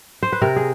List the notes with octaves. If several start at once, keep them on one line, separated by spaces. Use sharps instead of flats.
C5
B4
C3 A#4
G#4